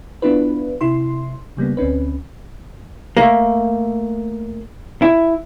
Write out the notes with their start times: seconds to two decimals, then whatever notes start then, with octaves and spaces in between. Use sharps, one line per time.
0.22 B3 D4 E4 F4 B4
0.81 C3 E4 C6
1.57 C#3 G3 A#3 B3
1.77 D2 C4 C#4 B4
3.17 A3 A#3
5.02 E4